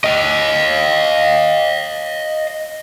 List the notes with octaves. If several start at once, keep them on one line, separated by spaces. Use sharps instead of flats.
D#5 F5